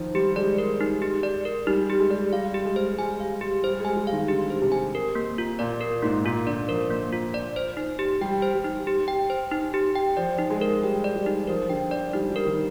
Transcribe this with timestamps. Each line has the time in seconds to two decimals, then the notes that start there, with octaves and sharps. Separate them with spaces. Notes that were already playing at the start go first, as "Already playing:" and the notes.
Already playing: D#3 F3
0.14 G3 G4
0.36 G#3 D5
0.58 A#4
0.81 D#4
1.02 G4
1.23 D5
1.45 A#4
1.67 G3 D#4
1.90 G4
2.00 G#3
2.11 D5
2.32 G3 F5
2.54 G4
2.65 G#3
2.76 C5
2.98 G3 G#5
3.20 F5
3.41 G4
3.63 G3 C5
3.80 G#3 G#5
3.96 G3
4.07 F5
4.13 D#3
4.28 D3 G4
4.50 C5
4.62 C3
4.72 G#5
4.95 A#4
5.15 A#3
5.38 F4
5.59 A#2 D5
5.81 A#4
6.03 G#2 A#3
6.25 A#2 F4
6.47 D3 D5
6.68 F3 A#4
6.90 A#3
7.12 F4
7.34 D5
7.56 C5
7.77 D#4
7.99 G4
8.21 G3 G5
8.42 C5
8.54 G3
8.64 D#4
8.87 G4
9.08 G5
9.30 C5
9.51 D#4
9.74 G4
9.95 G5
10.17 F3 D5
10.38 D#4
10.50 G#3
10.61 A#4
10.82 G3 G5
11.04 D5
11.15 G3
11.26 D#4
11.47 F3 A#4
11.69 D3 G5
11.91 D5
12.13 G3 D#4
12.30 G3
12.36 A#4
12.46 D#3